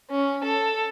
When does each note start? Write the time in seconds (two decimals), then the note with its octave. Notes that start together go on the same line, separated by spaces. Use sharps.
0.11 C#4
0.45 A4